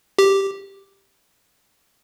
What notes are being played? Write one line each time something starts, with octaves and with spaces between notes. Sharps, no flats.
G4